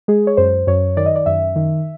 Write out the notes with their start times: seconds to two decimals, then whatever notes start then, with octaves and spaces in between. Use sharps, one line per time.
0.08 G#3 G#4
0.27 C#5
0.37 F#2 C5
0.67 F#2 C#5
0.97 D#3 D5
1.06 D#5
1.16 D5
1.26 F#2 E5
1.56 D#3